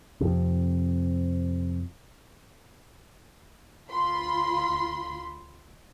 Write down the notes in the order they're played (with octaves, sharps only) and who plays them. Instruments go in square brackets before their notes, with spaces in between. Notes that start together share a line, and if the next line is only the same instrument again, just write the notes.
[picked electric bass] F2 C3
[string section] D2 F4 B5 C6